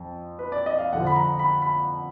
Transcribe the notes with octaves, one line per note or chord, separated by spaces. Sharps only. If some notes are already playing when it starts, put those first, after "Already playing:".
Already playing: F2 F3
B4
D5
D#5
F5
F2 D3 F3 F#5
B5
A#5
B5
B5